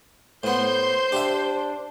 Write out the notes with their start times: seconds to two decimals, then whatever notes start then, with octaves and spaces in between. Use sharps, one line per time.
0.44 A2 B3 C5 C6 G6
1.12 D4 G4 E5